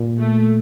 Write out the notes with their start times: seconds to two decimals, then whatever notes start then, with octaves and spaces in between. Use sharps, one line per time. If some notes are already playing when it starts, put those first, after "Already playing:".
Already playing: A#2
0.19 A3